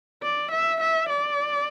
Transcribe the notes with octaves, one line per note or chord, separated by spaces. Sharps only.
D5
E5
E5
D5